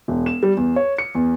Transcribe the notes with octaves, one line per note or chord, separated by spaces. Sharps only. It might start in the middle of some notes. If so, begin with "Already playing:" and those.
E1
E7
G3
E2
C#5
C#7
E2